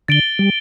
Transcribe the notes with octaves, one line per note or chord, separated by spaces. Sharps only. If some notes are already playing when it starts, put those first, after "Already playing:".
D3 A6 D7 G7
G3